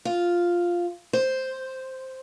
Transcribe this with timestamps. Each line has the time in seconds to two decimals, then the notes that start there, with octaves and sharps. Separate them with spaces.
0.05 F4
1.13 C5